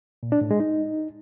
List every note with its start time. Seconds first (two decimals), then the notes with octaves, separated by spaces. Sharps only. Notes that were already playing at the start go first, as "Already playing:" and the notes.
0.23 A#2
0.32 D4
0.41 A2
0.51 G#3
0.60 D#4